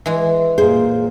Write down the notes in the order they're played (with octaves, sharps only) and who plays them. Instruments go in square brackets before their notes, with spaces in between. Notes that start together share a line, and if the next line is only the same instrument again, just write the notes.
[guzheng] E3 G#3
[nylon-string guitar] A#2 G#4 [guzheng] C5